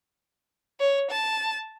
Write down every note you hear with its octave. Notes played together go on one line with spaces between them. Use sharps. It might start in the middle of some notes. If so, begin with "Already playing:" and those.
C#5
A5